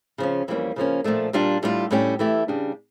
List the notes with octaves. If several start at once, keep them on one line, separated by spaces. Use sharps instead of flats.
C#3 F3 C#4
F2 E3 G3 A#3 C#4
C#3 F3 A#3 C#4
A#2 F3 A3 D4
A#2 G3 D4 F4
A2 G3 D4 F4
A2 G3 C#4 G4
E3 A3 E4 G4
C#3 G3 D4